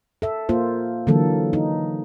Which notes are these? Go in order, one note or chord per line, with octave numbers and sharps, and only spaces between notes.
A4 E5
A#3 F4 C5
D3 E3 F#3 A#3 A4
D#4